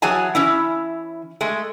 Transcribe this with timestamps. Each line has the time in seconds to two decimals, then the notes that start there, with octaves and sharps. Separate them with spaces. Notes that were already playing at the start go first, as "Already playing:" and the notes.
0.02 E3 F#3 G#4 G#5 A5
0.35 E3 C#4 E4
1.41 G#3 A3